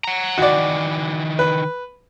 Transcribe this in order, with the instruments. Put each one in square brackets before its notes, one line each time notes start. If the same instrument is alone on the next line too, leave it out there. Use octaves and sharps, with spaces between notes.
[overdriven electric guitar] F#5 A#5
[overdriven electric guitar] D#3 E3 [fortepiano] F#4 D5
[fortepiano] B4